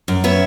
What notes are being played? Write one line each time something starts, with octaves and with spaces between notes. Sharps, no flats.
F#2
B3 C#5 E5